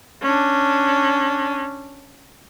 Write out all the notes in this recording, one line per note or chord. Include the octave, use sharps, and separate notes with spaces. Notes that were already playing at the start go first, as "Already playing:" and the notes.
C#4 D4